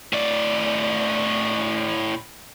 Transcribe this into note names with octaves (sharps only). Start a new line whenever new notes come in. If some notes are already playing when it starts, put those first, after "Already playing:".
A2 D5